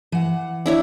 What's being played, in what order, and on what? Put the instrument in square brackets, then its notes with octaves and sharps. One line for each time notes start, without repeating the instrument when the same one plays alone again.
[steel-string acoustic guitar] E3 F#5
[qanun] D4 E4 C#5